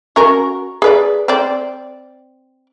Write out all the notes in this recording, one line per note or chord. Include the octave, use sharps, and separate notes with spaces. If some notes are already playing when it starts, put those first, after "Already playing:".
C#4 F#4 A#4
G#4 B4 D5
C4 D5